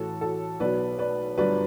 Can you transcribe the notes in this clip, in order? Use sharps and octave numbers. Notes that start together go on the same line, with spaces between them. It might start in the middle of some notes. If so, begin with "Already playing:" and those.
Already playing: A1 A2 E3 F#4 A4
F#4 A4
B1 B2 F#3 B4 D5
B4 D5
G1 G2 F#3 B4 D5